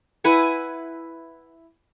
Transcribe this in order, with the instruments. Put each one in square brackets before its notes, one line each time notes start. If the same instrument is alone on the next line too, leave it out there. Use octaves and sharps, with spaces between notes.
[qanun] E4 B4 F#5 G#5